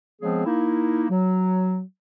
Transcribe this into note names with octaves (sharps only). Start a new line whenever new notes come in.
C#3 F3 G#3 B3 C4 G#4
A#3 D#4 E4
F#3